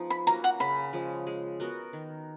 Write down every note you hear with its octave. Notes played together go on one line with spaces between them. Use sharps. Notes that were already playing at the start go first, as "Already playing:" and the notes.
Already playing: F3 G#3 B3 D#4
B5
A#3 C#4 F#4 A#5
F#5
C#3 B5
F3 G#3 C#4
G#3
B3 F#4 A#4
D#3